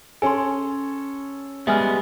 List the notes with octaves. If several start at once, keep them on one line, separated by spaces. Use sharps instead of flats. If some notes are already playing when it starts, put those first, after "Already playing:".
C#4 A4 G#5 C6
G3 G#3 B3 E5 G#5 F6